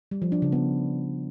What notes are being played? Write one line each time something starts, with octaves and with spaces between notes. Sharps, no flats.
G3
F3
D4
C#3
B3